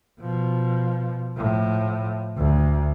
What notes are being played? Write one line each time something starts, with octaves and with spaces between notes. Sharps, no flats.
B2 F3
A2 F3
D2